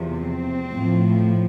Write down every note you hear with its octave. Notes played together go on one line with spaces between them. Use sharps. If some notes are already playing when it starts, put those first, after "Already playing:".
Already playing: E2 C3 F3
C4
A2 F3